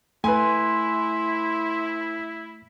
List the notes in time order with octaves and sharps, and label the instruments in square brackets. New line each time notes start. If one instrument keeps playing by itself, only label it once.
[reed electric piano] A3 [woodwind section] E4 [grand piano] B4 G#5 [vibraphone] C6